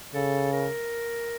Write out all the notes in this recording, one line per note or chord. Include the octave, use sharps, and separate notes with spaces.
C#3 A4
A#4